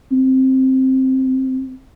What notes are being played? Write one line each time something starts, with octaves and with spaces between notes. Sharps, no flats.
C4